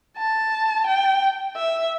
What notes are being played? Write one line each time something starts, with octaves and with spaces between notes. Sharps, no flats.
A5
G5
E5